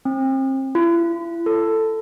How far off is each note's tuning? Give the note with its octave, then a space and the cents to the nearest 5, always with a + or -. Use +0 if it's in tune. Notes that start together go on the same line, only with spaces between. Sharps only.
C4 +35
E4 +40
A4 +10